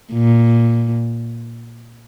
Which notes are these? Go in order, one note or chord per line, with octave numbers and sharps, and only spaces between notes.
A#2